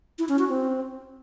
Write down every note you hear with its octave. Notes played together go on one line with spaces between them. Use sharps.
E4
C#4
F#4
C4